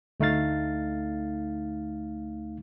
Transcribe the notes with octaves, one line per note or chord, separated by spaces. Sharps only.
D2 A3 D#4 F5 A6